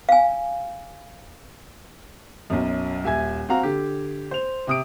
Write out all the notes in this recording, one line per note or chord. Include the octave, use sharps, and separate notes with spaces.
F5 G#5
B1 F#2
D#1 E5 G#5 G#6
C4 F#4 F5 A#5
D3 G4
C5 F7
C3 D#6 D7